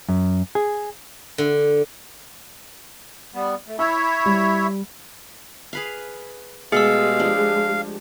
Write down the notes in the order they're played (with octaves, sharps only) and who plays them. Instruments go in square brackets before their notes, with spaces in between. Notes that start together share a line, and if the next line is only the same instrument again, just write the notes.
[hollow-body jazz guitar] F#2
G#4
[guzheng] D3
[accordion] G3 B3
A3
[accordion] E4 C#5 E5 [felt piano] E6
[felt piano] G3
[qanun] G#4 B4 F5
[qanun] B2 A3 [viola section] G#3 G4 [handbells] G#4 E6 [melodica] F5
[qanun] F3 D4